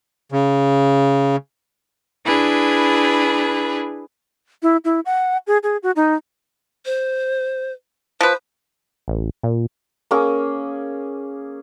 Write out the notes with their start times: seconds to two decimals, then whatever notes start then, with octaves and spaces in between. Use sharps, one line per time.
0.32 C#3
2.25 D4 E4 G#4 B4
4.63 E4
4.85 E4
5.06 F#5
5.47 G#4
5.63 G#4
5.83 F#4
5.96 D#4
6.86 C5
8.21 F3 B4 C5
9.08 A1
9.43 A#2
10.11 A#3 C#4 G#4